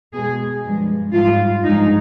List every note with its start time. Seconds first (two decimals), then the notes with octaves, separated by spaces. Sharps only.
0.13 B2 G#3 G#4
0.64 G2 F3 G#3
1.14 G#2 G3 F4
1.64 G2 F3 G#3 D#4